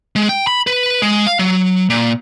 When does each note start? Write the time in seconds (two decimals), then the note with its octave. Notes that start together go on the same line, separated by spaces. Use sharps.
0.16 G#3
0.29 G5
0.47 B5
0.67 B4
1.02 G#3
1.27 F5
1.39 F#3
1.90 A#2